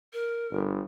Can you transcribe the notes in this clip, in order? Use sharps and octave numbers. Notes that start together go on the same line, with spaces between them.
A#4
G1